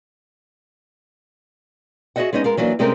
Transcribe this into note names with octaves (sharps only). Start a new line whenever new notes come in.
F#4 G#4 C5 D#5 E5 F#5
G#3 B3 C#4 D#4 D#5
G#3 F4 A#4
E3 F#3 A#3 D4
C3 G#3 A3 C4 C#4 A#4